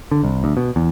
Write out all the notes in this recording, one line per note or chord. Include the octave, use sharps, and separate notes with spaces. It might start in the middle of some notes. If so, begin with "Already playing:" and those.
D3
C2
D2
B2
E2